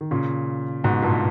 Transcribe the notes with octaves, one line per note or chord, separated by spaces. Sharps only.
D#3
A#2 C#3
G#2 B2
G2 A#2